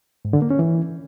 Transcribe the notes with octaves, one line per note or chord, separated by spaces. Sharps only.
G#2
D3
A#3
C#4
E3